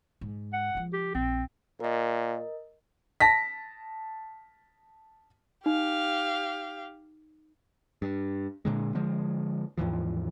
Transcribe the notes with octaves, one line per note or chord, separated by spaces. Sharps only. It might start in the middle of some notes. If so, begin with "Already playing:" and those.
G#2
F#5
C#3 F3
G4
A#1 C4
A#2 A#4 D#5
A5 A#6 B6
D#4 G4 F5
G2
A#2 D3 G#3
D3 F3 G#3
D#2 G#2 E3 F3